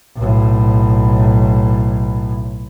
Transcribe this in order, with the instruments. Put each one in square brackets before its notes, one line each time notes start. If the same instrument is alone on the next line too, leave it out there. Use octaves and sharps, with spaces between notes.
[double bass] B1 A2